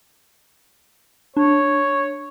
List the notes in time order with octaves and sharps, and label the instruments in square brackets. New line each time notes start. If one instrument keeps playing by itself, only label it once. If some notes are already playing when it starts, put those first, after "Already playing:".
[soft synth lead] D4 [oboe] C#5